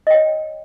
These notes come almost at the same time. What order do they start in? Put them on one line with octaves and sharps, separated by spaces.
D#5 G5 C#5